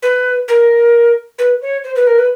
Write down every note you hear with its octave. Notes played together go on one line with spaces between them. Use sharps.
B4
A#4
B4
C#5
C5
B4
A#4
B4